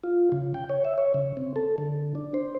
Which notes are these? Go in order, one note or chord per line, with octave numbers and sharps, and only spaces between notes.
F4
C#3
G5
C#5
E5
C#5
C#3
C4
A4
D3
D4
C5